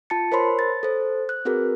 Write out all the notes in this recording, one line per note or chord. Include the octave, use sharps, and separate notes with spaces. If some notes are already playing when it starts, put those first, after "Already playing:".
F4 A5 A6 C#7
A#4 C5 C#5 B5 C6
A6
A4 C5
F#6
C4 F#4 G#4 A#4 B4